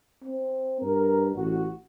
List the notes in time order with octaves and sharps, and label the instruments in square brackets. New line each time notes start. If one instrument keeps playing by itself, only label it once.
[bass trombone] C4
[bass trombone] G2 [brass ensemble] A#4
[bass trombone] A1 [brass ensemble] F#4